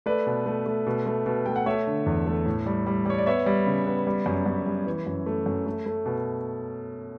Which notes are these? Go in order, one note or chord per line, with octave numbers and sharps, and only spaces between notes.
A3 B4 D5
B2
A3
A3
B2
A3
B2
A3 G5
F#5
A3 C#5 E5
D3
E2
A3
A2
G3
G3
G3 C#5
D5
B3 C#5 E5
G3
C#3
B3
G3
F#2
F#2
G3
E3
F#2
A3
F#2
A3
A3
B2